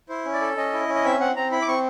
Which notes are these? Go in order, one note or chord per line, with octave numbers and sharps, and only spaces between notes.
E4 C5
C#4
D5
A4
C#4 D#5
E4
C#4
D#5
C4 E5
C4 F#5
C4 A#5
E4 B5
D6
C4 C#6